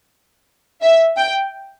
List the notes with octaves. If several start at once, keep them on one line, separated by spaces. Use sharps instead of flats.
E5
G5